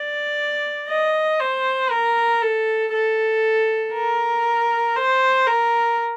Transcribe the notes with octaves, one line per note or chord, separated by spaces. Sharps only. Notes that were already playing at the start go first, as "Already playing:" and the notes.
Already playing: D5
D#5
C5
A#4
A4
A4
A#4
C5
A#4